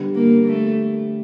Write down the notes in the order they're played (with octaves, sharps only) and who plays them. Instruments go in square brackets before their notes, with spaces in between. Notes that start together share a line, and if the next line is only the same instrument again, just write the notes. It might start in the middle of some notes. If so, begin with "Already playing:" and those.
Already playing: [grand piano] D3 G3 B3
[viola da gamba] A#3
A3